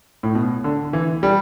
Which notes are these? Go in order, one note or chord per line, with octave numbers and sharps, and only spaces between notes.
A2
B2
D3
E3
G3